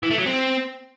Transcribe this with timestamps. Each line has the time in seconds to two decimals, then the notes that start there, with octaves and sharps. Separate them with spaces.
0.03 E3
0.11 A3
0.19 F#3
0.26 C4